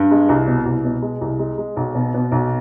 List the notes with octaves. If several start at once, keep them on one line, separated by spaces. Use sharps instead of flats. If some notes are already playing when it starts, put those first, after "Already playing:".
Already playing: G2
G#3
C2
B2
C2
B2
G#3
C2
G#3
G#3
B1
B2
B2
B1